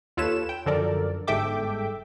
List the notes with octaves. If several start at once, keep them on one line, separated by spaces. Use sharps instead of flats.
D#2 F4 A4 B4 C#5 E7
G5
F#2 D3 F3 A4 A#4 D5
G1 G#2 A4 E5 G5 D6